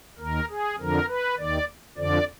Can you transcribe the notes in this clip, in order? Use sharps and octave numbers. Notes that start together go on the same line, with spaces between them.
D#2 D#3 A#4
G#4
F2 D3 F3 A#4
B4
D#2 D#3 D5
F2 D3 F3 D5